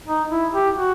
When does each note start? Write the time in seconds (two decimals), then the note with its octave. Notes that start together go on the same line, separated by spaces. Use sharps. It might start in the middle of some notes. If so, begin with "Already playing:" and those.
0.07 D#4
0.30 E4
0.53 G4
0.76 F#4